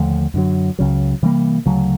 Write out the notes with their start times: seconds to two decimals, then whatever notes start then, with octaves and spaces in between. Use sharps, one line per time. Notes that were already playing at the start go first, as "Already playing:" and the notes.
Already playing: D#2 D3 F3 A3
0.34 F#2 D3 F#3
0.79 C#2 C#3 F#3
1.23 C3 E3 G3 A#3
1.66 D2 C#3 F#3